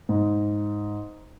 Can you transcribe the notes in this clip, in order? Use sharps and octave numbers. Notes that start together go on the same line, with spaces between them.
G#2